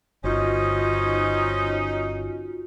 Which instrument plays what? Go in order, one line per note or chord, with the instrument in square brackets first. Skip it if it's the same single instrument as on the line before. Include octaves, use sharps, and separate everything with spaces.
[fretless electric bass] G1 [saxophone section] C#4 D#4 [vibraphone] F4 F#4 [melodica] C5 C#5 D#5